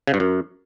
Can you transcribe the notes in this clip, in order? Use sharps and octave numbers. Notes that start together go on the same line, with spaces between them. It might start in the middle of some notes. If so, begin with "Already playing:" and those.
C#3
G2
F#2